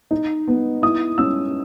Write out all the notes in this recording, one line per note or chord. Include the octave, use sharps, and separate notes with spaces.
D#4
B3
E4 D#6
C#4 E6